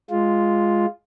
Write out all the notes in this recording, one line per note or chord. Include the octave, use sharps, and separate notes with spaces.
G#3 F4